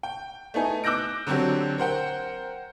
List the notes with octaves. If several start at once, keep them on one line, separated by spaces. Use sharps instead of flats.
G5
A3 B3 D#4 G#5
D6 E6 F#6 G6 A#6 D7
D3 F#3 C4 F#4 G4
A#4 C5 F#5 G5